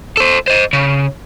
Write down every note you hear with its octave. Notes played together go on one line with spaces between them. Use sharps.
A4 C5
C5 D#5
C#3